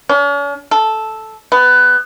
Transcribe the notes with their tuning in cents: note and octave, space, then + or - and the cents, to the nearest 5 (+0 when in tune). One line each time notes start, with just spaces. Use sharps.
C#4 +45
A4 -5
B3 +15